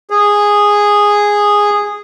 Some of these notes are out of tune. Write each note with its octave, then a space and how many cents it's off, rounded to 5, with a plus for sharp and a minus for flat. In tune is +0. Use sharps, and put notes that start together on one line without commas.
G#4 -10